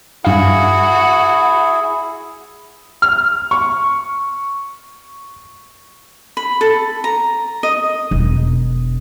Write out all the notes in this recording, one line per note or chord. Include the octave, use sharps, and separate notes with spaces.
G2 E4 F#4 G#4 F5
F6
C#6
B5
A4
A#5
D#5
E1